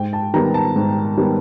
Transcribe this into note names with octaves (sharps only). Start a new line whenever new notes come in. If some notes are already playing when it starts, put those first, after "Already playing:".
Already playing: G#2 G5
A5
D#3 G3 B3 A#5
A5
G#2
D#3 G3 B3